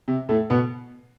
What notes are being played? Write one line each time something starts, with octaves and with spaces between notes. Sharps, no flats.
C3
A2 A3
B2 B3